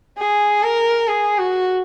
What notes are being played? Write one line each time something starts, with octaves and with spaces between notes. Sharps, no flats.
G#4
A#4
G#4
F#4